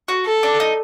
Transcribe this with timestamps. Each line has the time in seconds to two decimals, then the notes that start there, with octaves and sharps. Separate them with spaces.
0.08 F#4
0.26 A4
0.43 D4
0.60 D#4